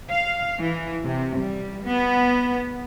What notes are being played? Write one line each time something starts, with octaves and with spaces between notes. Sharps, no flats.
F5
E3
C3
G3
B3